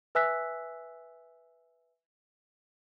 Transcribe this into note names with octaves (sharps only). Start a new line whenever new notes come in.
B4 E5 G#5 E6 F#6 B6